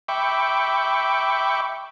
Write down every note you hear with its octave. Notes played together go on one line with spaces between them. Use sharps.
E5 G5 B5 C#6 D6